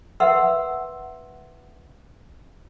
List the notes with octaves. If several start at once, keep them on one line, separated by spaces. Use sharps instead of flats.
A#4 B4 E5 F#5 C6 E6